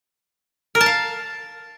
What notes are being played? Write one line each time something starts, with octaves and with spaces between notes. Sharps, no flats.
A#4
A5
F5